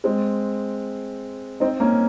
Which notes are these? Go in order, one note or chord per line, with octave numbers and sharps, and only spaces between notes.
G#3 C4
C4 D#4
A#3 C#4